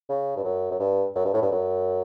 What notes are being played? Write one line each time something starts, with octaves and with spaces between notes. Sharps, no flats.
C#3
G2
F#2
F#2
G2
F#2
G2
A2
G2
F#2